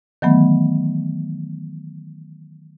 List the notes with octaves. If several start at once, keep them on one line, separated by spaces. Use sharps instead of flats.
D#3 E3 F#3 A3 B3